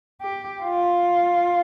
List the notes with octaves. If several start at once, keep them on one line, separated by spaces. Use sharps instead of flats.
G4
F4